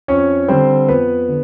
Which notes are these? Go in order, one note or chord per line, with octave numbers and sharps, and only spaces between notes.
F2 C#4 C#5
D3 G3 C4 C5
F2 B3 B4
D3